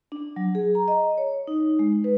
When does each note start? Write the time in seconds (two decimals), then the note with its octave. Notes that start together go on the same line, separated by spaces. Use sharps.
0.12 D4
0.36 F#3
0.55 G#4
0.75 A#5
0.88 D#5
1.18 C#5
1.47 D#4
1.79 G#3
2.04 B4